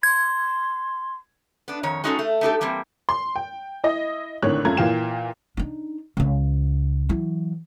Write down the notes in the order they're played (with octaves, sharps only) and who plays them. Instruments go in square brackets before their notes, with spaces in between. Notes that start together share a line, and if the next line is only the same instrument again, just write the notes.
[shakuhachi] C6 [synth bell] G#6
[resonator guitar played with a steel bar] B3 D4
F2 D#3 C#5
G#3 C#4 D#4 F#4 G#4 A4
A3
A3 D#4 G4 A4
E3 G3 A#3 C4
[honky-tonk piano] C6
G5
E4 D#5
G#1 A2 D3 D#3 C#5 F#6
F#2 A3 F4 A#5 G#6
A#2 E3 F5 G5 E7
[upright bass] D4 D#4
C#2 C#3
E3 F#3